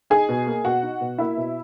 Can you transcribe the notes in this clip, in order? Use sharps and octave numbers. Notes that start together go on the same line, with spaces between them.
D#4 G#4 G#5
B2
A#3
B2 F#4 F#5
D#4
B2
A#3 E4 E5
B2